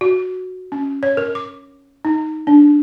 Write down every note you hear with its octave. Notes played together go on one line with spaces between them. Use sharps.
F#4
C#4
C#5
A#4
D6
D#4
D4